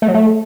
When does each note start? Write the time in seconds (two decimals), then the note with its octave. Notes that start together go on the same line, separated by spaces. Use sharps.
0.02 A3
0.08 F#3
0.14 A3